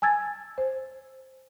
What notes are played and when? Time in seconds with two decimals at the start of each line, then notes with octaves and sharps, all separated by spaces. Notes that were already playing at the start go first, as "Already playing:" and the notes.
0.02 G#5 A5 E6 G#6 A6
0.58 C5